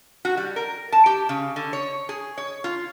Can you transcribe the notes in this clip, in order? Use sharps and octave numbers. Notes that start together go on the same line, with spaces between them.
F#4
G3
A#4
A5
G4
C#3
D3
C#5
G#4
C#5
F4